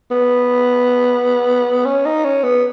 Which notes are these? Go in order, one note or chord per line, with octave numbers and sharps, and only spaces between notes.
B3
C#4
D#4
C#4
B3